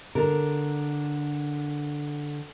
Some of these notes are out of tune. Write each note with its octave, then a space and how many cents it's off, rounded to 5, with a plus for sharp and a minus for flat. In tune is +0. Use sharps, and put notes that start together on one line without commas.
D3 +0 A#4 +0